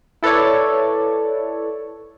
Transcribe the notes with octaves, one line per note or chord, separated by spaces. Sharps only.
E4 A4 B4 C#5 D5